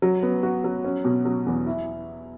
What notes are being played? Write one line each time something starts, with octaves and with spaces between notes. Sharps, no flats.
F#3
B3
F#4
F#3
C#4
B2
F#3
E2
E4